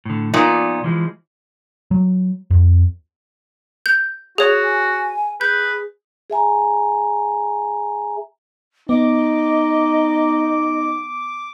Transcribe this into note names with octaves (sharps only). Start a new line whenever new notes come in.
A2 D3
A#2 F3 B3 D#4 D5
E3 F3 G#3
F#3
F2
G6
F#4 G#4 C#5
G#5
G#4 B4 G6
G#4 E5 G#5 A#5
B3 D#4 D#5 D6